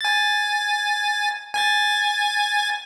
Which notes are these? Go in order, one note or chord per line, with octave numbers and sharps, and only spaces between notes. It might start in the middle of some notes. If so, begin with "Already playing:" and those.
G#5 A6
G#5 G#6 A6